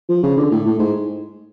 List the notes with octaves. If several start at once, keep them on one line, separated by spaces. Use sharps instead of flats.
F3
C#3
D3
A2
A2
G#2